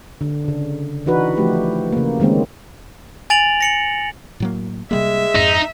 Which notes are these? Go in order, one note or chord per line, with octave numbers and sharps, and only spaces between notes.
D3
C#3 D4
E3 D4 D#4 F#4 B4
F3 A3 G4
C#3 A#3
D#3 G#3 A#3 C4 C#4
G#5 A6 D7 F7 F#7
A#6 C#7 F#7
A2 F#3 A#3
C3 G3 G#3 A#3 E5
F2 G#2 D#4